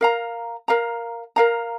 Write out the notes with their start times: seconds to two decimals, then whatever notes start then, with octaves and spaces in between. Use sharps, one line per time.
0.01 A#4 F5 A#5
0.68 A#4 F5 A#5
1.36 A#4 F5 A#5